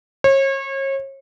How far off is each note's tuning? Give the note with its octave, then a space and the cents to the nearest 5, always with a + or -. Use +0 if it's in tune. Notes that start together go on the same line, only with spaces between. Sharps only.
C#5 -35